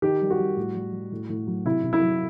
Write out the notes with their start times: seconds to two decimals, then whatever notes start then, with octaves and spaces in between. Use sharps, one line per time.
0.02 D#3 G4
0.22 G3
0.30 F#4
0.39 G3
0.56 A2
0.75 G3
0.93 G3
1.12 A2
1.30 A2
1.47 F#3
1.66 C3 E4
1.84 C3
1.93 E4
2.01 F#3